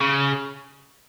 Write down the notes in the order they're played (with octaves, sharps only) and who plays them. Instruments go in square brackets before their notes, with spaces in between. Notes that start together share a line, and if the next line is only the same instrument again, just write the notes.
[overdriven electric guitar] C#3